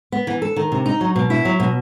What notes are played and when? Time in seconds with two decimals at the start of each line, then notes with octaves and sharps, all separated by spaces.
0.12 B3
0.27 E3
0.42 A4
0.56 D#3
0.72 C3
0.86 D#4
1.01 F#3
1.16 B2
1.30 E4
1.45 F#3
1.60 B2